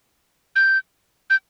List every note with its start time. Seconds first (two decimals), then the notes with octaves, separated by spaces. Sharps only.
0.56 G6
1.30 G6